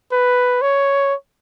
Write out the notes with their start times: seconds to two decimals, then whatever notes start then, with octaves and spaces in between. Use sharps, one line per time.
0.12 B4
0.62 C#5